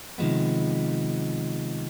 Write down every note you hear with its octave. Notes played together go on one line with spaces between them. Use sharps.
C3 D#3 F3 G#3 B3